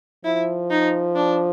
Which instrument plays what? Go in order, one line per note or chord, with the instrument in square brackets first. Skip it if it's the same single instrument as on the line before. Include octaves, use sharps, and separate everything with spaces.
[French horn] F3 [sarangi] E4
[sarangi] D#4
D4